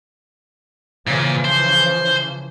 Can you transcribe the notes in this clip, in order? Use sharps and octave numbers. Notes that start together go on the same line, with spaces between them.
A#2 C#3 E3 F3
C5